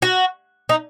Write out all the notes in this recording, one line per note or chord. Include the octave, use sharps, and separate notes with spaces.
F#4
D#4